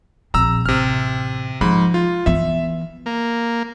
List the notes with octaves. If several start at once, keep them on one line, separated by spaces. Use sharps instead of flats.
A#1 C4 A#5 E6
A1 C3 F6
G#2 F3 B5
F4
E3 B3 E5
A#3